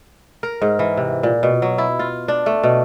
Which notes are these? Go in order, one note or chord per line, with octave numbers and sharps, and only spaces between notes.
A#4
G#2
E3
C3
A#2
B2
F#3
E4
F4
D4
A3
B2